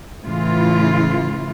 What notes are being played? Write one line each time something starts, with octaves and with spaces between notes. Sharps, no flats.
A2 C#3 E3 E4 F4